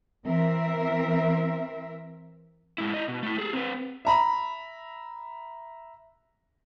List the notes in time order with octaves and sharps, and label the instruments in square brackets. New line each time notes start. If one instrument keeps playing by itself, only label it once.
[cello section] E3 C4 A#4 E5
[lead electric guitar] G#2 E4
E4 D#5
B2
A3 E4
G#4 A4
C4 B4
[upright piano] E5 A#5 B5